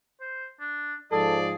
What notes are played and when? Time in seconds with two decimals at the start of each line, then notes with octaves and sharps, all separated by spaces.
0.20 C5
0.60 D4
1.12 G#2 F3 G#4 A4 D5